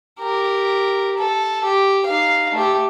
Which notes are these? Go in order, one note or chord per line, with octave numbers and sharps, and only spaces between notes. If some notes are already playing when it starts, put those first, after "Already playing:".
G4 A#4
A4
G4
D#4 F5
A3 G4